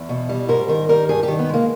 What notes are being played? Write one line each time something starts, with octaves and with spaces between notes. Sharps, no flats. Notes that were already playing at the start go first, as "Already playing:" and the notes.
Already playing: E2
B2
G3
G#2 A#4
D#3 A#4
G3 A#4
G2 G#4
D#3 G4
B3
G#3 A#3